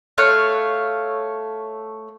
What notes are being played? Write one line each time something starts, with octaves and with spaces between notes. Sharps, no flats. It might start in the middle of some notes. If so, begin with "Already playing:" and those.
A3 C#5 F5 F#6